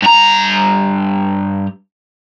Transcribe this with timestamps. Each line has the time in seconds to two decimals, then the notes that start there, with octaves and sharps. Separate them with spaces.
0.02 G2 A#5